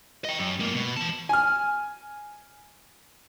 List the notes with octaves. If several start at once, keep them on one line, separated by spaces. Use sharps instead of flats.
D#5 G5
F#2
G#2 A#3
B2
E3 A5
G#5 F6